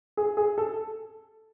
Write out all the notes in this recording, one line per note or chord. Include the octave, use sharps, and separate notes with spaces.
G#4
G#4
A4